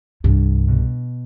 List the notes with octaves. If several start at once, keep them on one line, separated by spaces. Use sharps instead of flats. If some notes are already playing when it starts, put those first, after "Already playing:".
C2 G2
B2